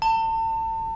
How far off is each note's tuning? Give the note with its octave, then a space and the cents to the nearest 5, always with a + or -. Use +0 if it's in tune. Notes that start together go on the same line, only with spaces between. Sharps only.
A5 +35